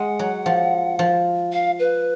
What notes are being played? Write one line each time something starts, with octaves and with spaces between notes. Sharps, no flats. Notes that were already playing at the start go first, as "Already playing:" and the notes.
Already playing: G#3 F#5
F#3
F3
F3
F5
B4